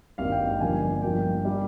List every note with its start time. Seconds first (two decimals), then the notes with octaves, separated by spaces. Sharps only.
0.18 G#1 G2 G3 A#3 F5
0.32 G5
0.46 F5
0.60 G1 G2 F3 A#3 G#5
1.02 G2 F3 A#3 G5
1.45 G3 A#3